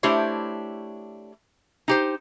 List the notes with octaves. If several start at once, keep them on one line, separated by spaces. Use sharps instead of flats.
A3 D4 E4 G4 C5 C#5
D#4 G4 C5